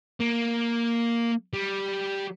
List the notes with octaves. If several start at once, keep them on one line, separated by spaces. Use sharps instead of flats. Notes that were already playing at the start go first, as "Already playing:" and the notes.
A#3
G3